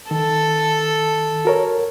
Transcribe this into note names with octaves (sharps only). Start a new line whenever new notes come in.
D#3 A4
F#4 A#4 C#5